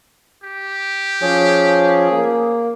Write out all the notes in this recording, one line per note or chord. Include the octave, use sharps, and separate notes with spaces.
G4
F3 C#4 G#4
A#3